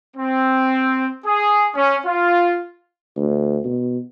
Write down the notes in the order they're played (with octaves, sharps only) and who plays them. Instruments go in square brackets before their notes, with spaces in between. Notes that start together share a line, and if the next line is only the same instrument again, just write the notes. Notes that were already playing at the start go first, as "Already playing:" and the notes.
[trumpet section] C4
G#4
C#4
F4
[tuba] D2
B2